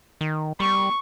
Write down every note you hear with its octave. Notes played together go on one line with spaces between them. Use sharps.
D#3
G3 C#6